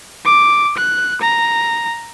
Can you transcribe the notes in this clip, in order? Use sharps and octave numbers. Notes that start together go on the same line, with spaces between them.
D6
F#6
A#5